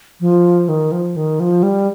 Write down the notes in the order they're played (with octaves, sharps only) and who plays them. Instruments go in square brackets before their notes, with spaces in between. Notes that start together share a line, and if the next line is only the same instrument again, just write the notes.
[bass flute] F3
D#3
F3
D#3
F3
G3